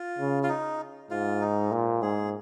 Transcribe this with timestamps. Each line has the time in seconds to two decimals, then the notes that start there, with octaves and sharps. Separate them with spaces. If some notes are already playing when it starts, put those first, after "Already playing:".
Already playing: F4
0.18 C#3
0.43 F4
0.49 D#4
1.11 G#2 F4
1.41 D#4
1.72 A#2
2.02 G#2 G#4